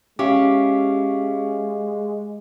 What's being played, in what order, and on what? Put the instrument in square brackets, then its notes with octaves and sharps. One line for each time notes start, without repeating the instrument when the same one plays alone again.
[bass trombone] G#3 [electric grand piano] C#4 E5 [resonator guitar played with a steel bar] G4 [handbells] F5 C#6 D6